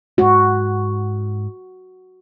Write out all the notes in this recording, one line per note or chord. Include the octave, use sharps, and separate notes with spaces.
G#2 G#3 F#4